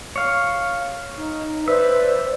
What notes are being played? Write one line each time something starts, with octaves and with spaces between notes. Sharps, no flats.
C#5 F5
D#4
B4 C5 D5 E5